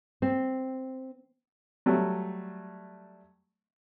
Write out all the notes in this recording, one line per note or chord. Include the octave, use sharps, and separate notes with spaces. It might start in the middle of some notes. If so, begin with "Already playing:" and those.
C4
F#3 G3 A3